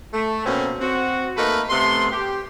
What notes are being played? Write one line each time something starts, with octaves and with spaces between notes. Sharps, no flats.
A3
B2 A#3 C4 C#4
C4 F#4
A3 A#3 D#4 A#4 B4
C3 A3 B3 C6
G4